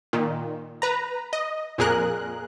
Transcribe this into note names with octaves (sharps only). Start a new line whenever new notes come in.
A#2 D#3
B4 A#5
D#5
F2 A#2 G#4 A#4 F#6